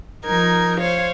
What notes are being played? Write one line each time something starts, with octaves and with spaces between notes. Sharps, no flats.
F3 D#4 A#4 G#6
C5 C#5 F5